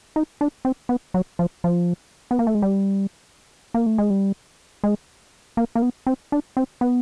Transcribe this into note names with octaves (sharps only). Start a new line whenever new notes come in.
D#4
D4
C4
B3
F#3
F3
F3
B3
A#3
A3
G#3
G3
A#3
A3
G#3
G3
G#3
A#3
A#3
B3
C4
D4
C4
B3